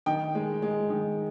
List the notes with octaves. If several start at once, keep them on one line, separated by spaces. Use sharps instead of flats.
D#3 G5
G#3
G#3
D#3